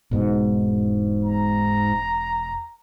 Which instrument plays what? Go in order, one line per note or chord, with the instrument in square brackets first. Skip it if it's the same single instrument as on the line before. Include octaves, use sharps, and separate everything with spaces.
[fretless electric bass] E1 B2 [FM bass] G#2
[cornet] A#5